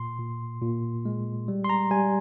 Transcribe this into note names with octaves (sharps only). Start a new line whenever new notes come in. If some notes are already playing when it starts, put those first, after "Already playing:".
Already playing: A#2 C6
A#2
A#2
G#3
G3
C6
A#5
G3 G#5